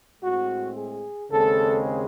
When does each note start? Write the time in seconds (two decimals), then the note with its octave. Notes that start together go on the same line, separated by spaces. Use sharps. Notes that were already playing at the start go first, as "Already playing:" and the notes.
0.21 A2 G#3 C4 F#4
0.76 G#4
1.30 D#2 C#3 G#3 C4 A4